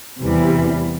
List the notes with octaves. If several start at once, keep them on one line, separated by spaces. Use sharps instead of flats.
E2 C3 E3 G3